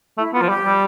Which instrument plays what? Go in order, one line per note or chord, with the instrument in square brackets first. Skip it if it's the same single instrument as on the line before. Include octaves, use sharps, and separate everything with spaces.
[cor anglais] A3 [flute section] E4
[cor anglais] B3 [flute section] F4
[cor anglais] F3
[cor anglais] G3 [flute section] G4
[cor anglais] G3